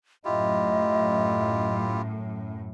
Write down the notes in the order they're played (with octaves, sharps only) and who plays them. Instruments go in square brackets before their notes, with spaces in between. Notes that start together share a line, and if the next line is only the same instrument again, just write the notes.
[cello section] F#2 A2 [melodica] E4 F4 G4 [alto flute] D#5